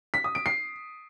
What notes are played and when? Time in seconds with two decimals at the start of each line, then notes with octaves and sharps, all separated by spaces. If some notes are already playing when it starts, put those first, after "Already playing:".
0.14 B6
0.24 D#6
0.35 D7
0.46 C7